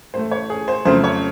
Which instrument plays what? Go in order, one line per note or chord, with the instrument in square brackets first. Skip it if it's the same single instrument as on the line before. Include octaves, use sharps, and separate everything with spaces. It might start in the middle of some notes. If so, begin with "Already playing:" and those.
[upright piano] A2 E3 A3 C5
C#5
G#4
C5
F2 C#3 F#3 A3 C4 C5
C#5